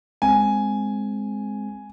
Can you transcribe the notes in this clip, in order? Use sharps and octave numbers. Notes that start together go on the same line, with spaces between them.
G#3 C4 G#5